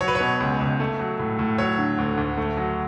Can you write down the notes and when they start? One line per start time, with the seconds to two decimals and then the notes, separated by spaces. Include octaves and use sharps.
0.01 F#3 C#5
0.08 B4
0.15 C#5
0.20 B2
0.40 C#2
0.60 C#2
0.80 A3
1.00 F#3
1.19 A2
1.39 A2
1.58 F#3 C#5
1.78 D3
1.98 D2
2.17 D2
2.37 A3
2.57 F#3